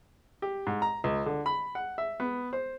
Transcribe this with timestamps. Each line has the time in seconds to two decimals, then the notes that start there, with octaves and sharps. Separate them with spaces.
0.42 G4
0.67 G#2
0.82 A#5
1.04 C#2
1.26 D3
1.46 B5
1.75 F#5
1.98 E5
2.20 B3
2.53 C5